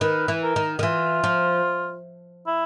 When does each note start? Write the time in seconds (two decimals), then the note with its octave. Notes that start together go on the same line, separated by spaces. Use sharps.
0.01 D#3 B4
0.28 E3
0.43 A#4
0.56 D#3
0.79 D#3
0.83 E3 F4
1.24 F3
2.47 E4